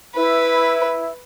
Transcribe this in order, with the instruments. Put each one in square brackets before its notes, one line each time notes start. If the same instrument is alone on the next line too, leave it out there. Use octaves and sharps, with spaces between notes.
[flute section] E4 [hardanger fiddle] B4